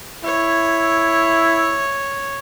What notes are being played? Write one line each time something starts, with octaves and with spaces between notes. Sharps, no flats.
E4 C#5